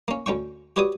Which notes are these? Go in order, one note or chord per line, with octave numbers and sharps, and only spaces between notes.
A#3 C#4
D2 C#4 G5 C#6
F#4 G4 B4 C#5 D5 D#6